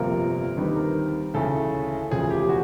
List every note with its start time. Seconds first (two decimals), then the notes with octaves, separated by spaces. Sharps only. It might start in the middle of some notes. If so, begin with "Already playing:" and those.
Already playing: G1 F2 C3 F3 A#3 A#4
0.57 D#2 D3 G3 C4 D#4 B4
0.76 A#4
1.34 D2 C#3 E3 A3 A4
2.10 E1 D2 C#3 F3 G#4
2.30 G4
2.49 F#4